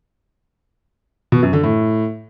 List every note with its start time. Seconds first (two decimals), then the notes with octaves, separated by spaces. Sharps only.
1.32 B2
1.42 F#2
1.53 D3
1.63 A2